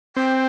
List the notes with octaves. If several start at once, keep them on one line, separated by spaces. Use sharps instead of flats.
C4 G5